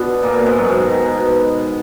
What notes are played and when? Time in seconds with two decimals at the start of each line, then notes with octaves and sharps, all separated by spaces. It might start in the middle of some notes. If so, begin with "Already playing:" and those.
Already playing: B2 D3 B3 D4
0.23 A#2 A#3
0.34 B2 B3
0.46 G#2 G#3
0.57 F#2 F#3
0.68 G#2 G#3
0.80 D#3
0.91 D#3
1.02 B2
1.15 B2
1.26 B2